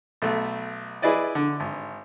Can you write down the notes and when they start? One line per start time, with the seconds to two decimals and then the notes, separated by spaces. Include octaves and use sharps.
0.22 B1 A3
1.02 E4 G#4 B4 D5 D#5
1.35 D3
1.60 G#1